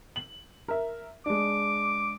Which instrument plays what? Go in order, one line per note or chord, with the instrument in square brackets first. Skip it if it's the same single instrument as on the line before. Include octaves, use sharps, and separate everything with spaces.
[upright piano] F#7
A#4 E5
[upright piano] G#3 D4 [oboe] D6